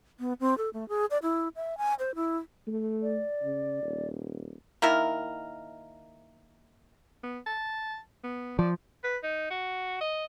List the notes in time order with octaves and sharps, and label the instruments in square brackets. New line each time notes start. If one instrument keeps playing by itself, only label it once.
[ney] B3
C4
A4
A3
G#4
D5
E4
E5
G#5
C5
E4
[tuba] A3
[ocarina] D5
[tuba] C#3
D#1
[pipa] D#3 A#3 E4 A#4
[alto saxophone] B3
A5
B3
[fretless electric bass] F3 [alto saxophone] D5
[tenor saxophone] B4
D#4
F#4
D#5